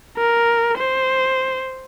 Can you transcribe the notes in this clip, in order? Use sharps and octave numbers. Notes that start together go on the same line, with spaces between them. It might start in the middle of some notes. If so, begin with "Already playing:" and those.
A#4
C5